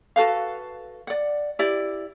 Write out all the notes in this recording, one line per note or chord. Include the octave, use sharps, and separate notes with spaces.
F#4 A4 B4 F5
D5 F#5
E4 G4 D5